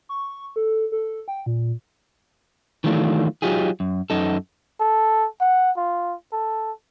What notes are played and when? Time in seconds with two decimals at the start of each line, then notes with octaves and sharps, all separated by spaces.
0.09 C#6
0.56 A4
0.92 A4
1.28 G5
1.46 A#2
2.84 D#3 E3 F#3 A3 D4 F4
3.42 F#3 D#4 F4 G4 G#4
3.80 F#2
4.10 F#2 D#4 A4
4.80 A4
5.41 F#5
5.77 F4
6.32 A4